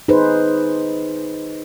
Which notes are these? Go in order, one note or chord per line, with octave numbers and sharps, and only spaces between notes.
D#4 G#4 B4 C5